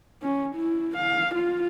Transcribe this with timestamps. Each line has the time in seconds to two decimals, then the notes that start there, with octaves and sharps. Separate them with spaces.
0.22 C#4
0.55 E4
0.97 F5
1.35 F4